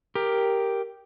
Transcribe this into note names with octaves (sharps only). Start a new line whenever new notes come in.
G4 A#4